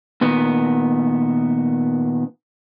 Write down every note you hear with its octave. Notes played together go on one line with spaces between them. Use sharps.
A#2 D#3 B3